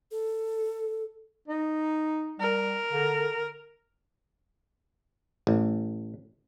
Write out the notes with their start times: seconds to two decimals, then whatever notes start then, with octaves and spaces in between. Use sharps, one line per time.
0.11 A4
1.48 D#4
2.40 G3 A#4
2.93 D3
5.47 A1